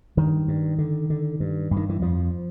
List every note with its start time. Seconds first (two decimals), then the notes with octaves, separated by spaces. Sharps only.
0.17 G2 D#3
0.48 G2
0.78 D3
1.10 D3
1.40 G2
1.71 G2
1.76 D#3
1.89 E3
2.01 F2 F3